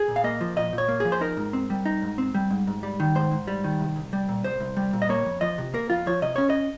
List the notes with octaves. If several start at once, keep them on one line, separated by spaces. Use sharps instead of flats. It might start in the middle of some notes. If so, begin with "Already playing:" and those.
Already playing: G#4
A#2
F5
A#3 D#5
F3
A#2 D#5
A#2
C#5
A#3
F3 G#4
C5
D#4 A#4
G#2
C4
G3
D#4
G#2
C4
G3
G#2
G#2
G3
D#3
G#2 C5
G#2
G3
D#3
C2
C2
G3
A#2
C2 C5
C2
G3
A#2
D#5
A#3 C#5
F2
F3 D#5
C3
A#3 A#4
F2 F4
F3 C#5
C3 D#5
C#4 C#5
D#5